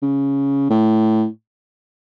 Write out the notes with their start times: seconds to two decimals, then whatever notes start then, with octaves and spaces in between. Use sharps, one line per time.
0.03 C#3
0.70 A2